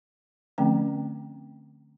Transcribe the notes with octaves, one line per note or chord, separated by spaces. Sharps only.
D3 F3 A3 C4 C#4 G5